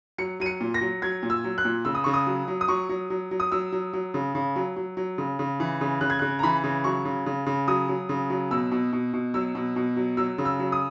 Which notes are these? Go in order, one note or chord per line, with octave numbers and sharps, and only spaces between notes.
F#3 C#7
F#3 D#7
C#7
A#2
A#6
F#3
F#3 G#6
A#2
E6
F#3
F#6
A#2
C#3 E6
D#6
C#3 C#6
D#6
F#3
F#3
D#6
F#3 C#6
F#3
F#3
F#3
D#6
F#3 E6
F#3
F#3
C#3
C#3
F#3
F#3
F#3
C#3
C#3
E3
C#3
C#3 F#6
G#6
F#6
C#3
A#5
E3 B5
C#3
F#3 C#6
C#3
C#3
C#3
F#3 D#6
F#3
C#3
F#3
B2 E6
B2
B2
B2
F#3 E6
B2
B2
F#3
F#3 E6
C#3
E6
F#3
D#6